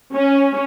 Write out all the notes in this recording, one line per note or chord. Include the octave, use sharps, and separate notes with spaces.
C#4